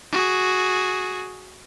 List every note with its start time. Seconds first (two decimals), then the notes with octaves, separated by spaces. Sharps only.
0.12 F#4 G#4